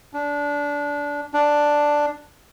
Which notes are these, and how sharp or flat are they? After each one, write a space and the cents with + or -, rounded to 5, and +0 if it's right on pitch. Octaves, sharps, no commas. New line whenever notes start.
D4 -20
D4 +5